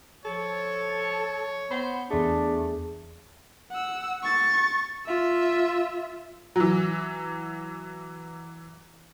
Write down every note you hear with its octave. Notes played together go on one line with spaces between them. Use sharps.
F3 A4 C#5
B3 C5 B5
E2 A3 D4 G#4
F#5 E6
C#6 A6
F4 E5
E3 F#3